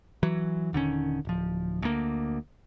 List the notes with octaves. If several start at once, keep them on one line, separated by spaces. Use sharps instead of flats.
E3 F#3
D#1 D3 D#3 C#4
D1 F3
D2 A#3